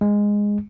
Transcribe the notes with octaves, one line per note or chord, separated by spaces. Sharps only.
G#3